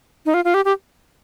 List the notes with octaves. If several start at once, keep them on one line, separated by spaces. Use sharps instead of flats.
D#4
F4
F4
G4
G4